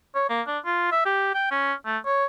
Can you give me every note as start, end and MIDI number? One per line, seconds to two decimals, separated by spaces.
0.15 0.28 73
0.29 0.41 58
0.47 0.58 62
0.65 0.89 65
0.92 1.03 76
1.05 1.32 67
1.34 1.48 79
1.51 1.73 61
1.86 1.98 57
2.05 2.25 73